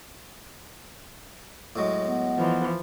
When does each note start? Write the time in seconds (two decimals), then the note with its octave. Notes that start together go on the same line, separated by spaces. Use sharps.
1.76 A2 F#3 G#3
2.05 B3
2.38 E3 F3